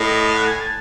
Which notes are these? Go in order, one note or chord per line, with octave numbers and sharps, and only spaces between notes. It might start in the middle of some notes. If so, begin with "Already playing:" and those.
Already playing: A2 D#5
F#5
G#5
A5